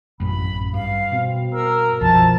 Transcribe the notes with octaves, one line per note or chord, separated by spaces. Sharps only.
A1 F#2 F#3 B5
G2 F5
B2 C4
A#4 E6
B1 F#2 F3 A5 A6